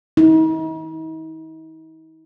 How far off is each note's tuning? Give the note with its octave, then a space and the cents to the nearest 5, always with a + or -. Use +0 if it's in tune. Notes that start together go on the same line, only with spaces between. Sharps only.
D#4 +45